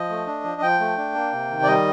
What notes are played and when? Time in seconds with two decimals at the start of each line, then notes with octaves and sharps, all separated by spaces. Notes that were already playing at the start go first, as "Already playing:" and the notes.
Already playing: F3 D#5
0.10 A3
0.26 D4
0.44 F3
0.62 F3 G5
0.80 A3
0.98 D4
1.15 A#3
1.33 C3
1.51 D#3
1.63 D5
1.67 G3 D#5